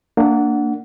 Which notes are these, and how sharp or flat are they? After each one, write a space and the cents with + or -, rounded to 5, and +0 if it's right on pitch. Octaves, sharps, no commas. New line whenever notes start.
A#3 -20 D4 +0 F#5 +0